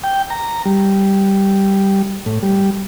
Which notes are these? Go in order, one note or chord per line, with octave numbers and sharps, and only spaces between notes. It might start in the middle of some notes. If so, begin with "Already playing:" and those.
G5
A#5
G3
A2
G3